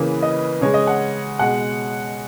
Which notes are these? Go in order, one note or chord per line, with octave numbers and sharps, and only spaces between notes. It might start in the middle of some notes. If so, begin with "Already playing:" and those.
Already playing: C#3 E3 A#3 B4
D#5
C#3 G#3 C#5
D#5
F#5
B2 G#3 F#5